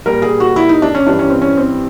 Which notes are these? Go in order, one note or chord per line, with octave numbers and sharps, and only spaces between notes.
A#2 G3 A#4
G#4
F#4
E4
D#4
D4
C#4
G2 E3 G3 D4
C#4
C4
C#4
C4